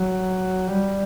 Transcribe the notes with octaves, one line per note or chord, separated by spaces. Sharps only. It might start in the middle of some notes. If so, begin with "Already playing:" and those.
Already playing: F#3
G3